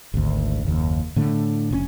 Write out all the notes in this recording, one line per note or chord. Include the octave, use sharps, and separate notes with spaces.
G#1 D2
F#1 D#2
A2 D3 A3
F1 A#2 C#4